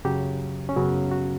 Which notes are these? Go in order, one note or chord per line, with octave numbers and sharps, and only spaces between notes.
F#2 C#3 F#3 G4
C#4
F#2 C#3 F#3 B3
F#4